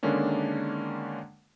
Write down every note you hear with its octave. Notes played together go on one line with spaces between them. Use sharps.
D3 D#3 G#3 A#3 C#4 D4